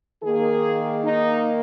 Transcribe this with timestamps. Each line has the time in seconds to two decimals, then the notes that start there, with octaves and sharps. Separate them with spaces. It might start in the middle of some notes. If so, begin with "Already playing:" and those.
0.22 D#3 A#3 G#4
1.03 D#4